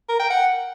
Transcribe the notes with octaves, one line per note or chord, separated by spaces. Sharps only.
A#4
G5
F#5